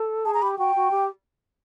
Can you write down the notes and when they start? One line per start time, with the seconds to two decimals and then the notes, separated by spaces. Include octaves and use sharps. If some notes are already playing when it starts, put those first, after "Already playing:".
Already playing: A4
0.25 G#4 A5
0.34 A#5
0.42 G4 B5
0.58 F#4 G5
0.76 F#4
0.91 G4